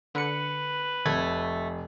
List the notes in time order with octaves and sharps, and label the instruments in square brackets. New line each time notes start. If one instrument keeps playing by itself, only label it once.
[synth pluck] D3 C#7 [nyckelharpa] B4
[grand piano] F1 [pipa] A3 [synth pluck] G#6